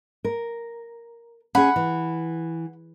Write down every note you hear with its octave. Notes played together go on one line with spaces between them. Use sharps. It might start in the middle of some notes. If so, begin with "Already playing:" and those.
A#4
C#4 G#4 F#5 B5
E3